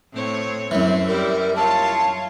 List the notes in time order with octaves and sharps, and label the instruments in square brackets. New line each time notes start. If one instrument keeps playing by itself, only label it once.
[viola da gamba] A2 C4 C#5
[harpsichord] F#2 E3 [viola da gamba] C4
[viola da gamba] G3 E4 [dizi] A#4
[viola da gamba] F4 C#5 [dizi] A5